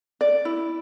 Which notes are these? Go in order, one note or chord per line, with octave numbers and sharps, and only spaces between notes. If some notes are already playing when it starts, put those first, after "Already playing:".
D5
E4